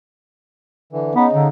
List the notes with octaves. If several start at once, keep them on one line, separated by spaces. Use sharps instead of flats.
D3 E3
C#3 B3 D#4
D3